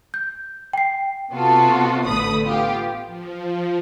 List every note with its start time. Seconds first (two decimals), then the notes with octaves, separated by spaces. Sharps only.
0.14 G6
0.73 G5 C7
1.31 C3 B3 F4 F#4 A4
2.06 A1 D3 A3 B4 B5 D#6
2.43 B3 F4 G4
3.07 F3